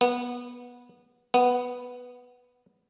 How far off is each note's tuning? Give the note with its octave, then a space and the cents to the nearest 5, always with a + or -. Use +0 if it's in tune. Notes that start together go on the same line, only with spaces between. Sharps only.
B3 -15
B3 +0